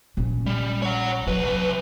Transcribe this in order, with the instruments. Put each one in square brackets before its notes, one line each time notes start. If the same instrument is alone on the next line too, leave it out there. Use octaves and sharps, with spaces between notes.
[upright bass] A#1 C#4
[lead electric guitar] G3
C#5 F#5
[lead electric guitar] C2 B4 [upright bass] F#3